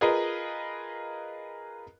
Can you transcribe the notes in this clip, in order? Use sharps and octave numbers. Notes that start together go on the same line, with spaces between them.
F4 G#4 A#4 B4 D#5